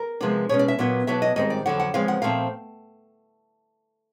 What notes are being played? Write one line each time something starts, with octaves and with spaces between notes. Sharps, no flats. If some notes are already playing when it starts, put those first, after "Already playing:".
Already playing: A#4
C3 F3 G#3 B3 D4
B2 G#3 C#4 C#5
D5
E5
A#2 F#3 B3 D4
B2 F#3 B3 D4 E5
D#5
G#2 D#3 G3 C4 D#5
D5
F2 D3 F#3 F#5
F#5
E2 C#3 F3 G#3 C4 F5
F#5
A#2 F3 A3 C4 F5